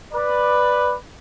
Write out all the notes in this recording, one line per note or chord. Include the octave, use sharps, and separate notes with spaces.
B4 D5